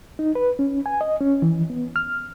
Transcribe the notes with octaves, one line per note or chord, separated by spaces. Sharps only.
D#4
B4
C#4
G#5
D#5
C#4
E3
B3
F6